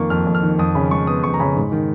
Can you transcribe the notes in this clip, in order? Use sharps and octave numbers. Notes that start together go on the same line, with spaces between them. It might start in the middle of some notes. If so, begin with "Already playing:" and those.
Already playing: F2 D#3 A#3 C#6
F2 F6
F2
F6
D#3
F2 D#6
C#3 B5
G#3 C#6
B3 D#6
F2 C#6
A#5
C#3 B5
G#2
D#3